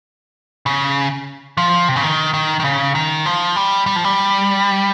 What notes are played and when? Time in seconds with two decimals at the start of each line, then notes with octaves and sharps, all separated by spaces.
0.66 C#3
1.57 F3
1.89 C3
1.96 C#3
2.04 D#3
2.34 D#3
2.60 D#3
2.64 C#3
2.95 D#3
3.26 F3
3.56 G3
3.86 G3
3.96 F3
4.04 G3